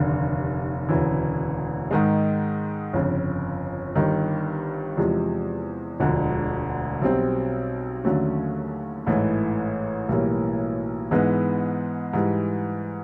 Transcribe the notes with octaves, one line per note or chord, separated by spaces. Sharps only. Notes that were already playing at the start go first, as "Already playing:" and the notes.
Already playing: F1 D#2 D3
E1 D2 C#3 E3
G#2 D#3 G#3
G1 F2 C#3
G1 G2 D#3
E2 C3 F3 G#3
E1 D2 D3 F3 G#3
B1 B2 G3 C4
D#2 D3 F#3 A3 C#4
A1 G#2 E3 A3
B1 A2 E3 G3 A#3
G#2 E3 G#3 B3 D#4
G#2 E3 G3